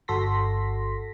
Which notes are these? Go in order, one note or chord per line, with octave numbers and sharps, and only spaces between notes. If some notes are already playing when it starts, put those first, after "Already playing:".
G1 F#4 A4 C6 A#6 B6